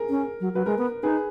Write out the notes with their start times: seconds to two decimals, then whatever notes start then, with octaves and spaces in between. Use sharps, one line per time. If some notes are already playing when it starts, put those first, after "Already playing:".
Already playing: G#4 A#4
0.10 C#4
0.40 F#3
0.54 F#3 B4
0.66 G#3 A#4
0.78 B3
1.03 D#4 G#4 B4